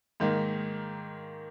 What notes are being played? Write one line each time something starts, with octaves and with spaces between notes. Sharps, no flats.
G#2 D#3 A#3